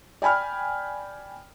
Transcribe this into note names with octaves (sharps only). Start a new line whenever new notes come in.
D5 G5 G#5 B5 F6